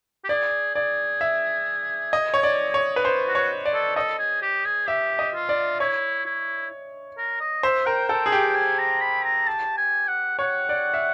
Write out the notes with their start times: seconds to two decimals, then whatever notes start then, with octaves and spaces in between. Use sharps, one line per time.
0.25 G4
0.29 G#4 D5
0.75 G#4 D5
1.21 E5
2.13 D#5
2.34 C#5
2.43 D5
2.74 C#5
2.96 B4
3.05 C5
3.28 F#4
3.35 C#5
3.66 D5
3.74 A4
3.96 A4 D#5
4.19 G#4
4.42 G4
4.65 G#4
4.88 G4 E5
5.19 D#5
5.34 F4
5.49 D5
5.80 E4 C#5
6.26 E4
7.18 A#4
7.41 D#5
7.63 C5 E5
7.86 A#4 G5
8.09 A4 G5
8.26 G#4
8.32 G4 G5
8.55 G#5
8.78 A#5
9.01 B5
9.24 A#5
9.47 A5
9.77 G#5
10.08 F#5
10.39 C#5 F#5
10.69 D5
10.94 E5